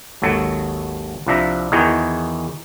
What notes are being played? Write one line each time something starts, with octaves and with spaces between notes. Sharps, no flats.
G#1 D#2 F#3 A4
C2 F3 D4 E5 A#5
E2 D#3 E3 D#4 F#4 G#4